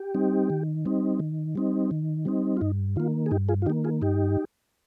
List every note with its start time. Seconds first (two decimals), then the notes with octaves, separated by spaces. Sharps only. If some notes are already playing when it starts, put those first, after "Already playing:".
Already playing: G4
0.15 G3 C4 D#4
0.50 D#3
0.85 G3 C4 D#4
1.20 D#3
1.56 G3 C4 D#4
1.91 D#3
2.25 G3 C4 D#4
2.57 F4
2.61 G2 D#4
2.96 D#3 A#3 F4
3.26 G#4
3.31 G2 D#4 G4
3.49 F4 G#4
3.62 F4
3.66 D#3 A#3 D#4 G4
3.84 F4 G#4
4.02 G2 D#4 G4